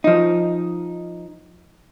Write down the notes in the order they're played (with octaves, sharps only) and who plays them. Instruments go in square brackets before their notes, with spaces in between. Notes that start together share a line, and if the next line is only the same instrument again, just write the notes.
[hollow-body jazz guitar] F3 D#4